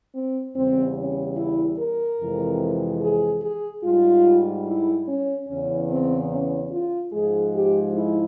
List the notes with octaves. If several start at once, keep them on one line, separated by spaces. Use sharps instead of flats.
C4
E2 C#3 G3 C4
C#4
E4
A#4
F2 C3 E3 G#3
G#4
G#4
G#2 G3 F4
E4
C#4
E2 C#3 E3 C#4
C4
C#4
F4
G#2 F3 G#3 G#4
G4
E4